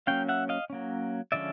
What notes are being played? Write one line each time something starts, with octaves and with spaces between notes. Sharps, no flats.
F#3 A#3 C#4 F5 G5
E5 F#5
D#5 F5
F#3 A#3 C#4
D3 F3 G#3 C#4 D5 E5